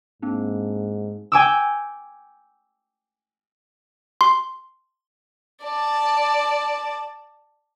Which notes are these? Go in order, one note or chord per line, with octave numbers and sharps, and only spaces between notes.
G#2 A#3 C4 D4
G5 G#5 D6 E6
C6
D5 A5